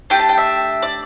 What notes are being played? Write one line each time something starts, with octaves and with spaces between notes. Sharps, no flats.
A3 D4 G4 G5
A5
G5
E5
D5